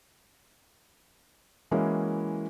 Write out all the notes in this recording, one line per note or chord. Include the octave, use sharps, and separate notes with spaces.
E3 G#3 A#3 C#4 E4 F#4